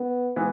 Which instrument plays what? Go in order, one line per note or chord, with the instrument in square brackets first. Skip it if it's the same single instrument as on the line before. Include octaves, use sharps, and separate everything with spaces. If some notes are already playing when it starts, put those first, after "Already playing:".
Already playing: [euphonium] B3
[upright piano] E3 G#3 B3